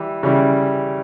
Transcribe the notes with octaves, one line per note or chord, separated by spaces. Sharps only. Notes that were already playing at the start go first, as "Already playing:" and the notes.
Already playing: E3 G3
C#3 E3 G3